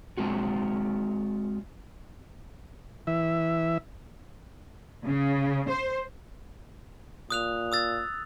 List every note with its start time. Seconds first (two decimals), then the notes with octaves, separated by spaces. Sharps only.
0.17 G#3 C4 F4 F#4
3.07 E3 E5
5.06 C#3
5.69 C5
7.30 A#2 D#6 F#6 F7
7.72 D#6 E6 A6